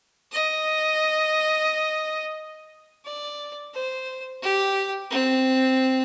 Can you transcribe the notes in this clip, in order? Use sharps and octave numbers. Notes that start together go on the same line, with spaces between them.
D#5
D5
C5
G4
C4